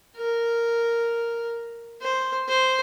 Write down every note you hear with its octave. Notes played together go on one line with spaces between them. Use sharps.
A#4
C5
C5